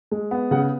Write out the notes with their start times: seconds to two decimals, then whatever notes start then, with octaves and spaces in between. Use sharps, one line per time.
0.11 G#3
0.31 B3
0.51 C#3 F#5